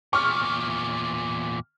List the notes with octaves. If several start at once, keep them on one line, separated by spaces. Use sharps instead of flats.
E2 A#2 C#6 F6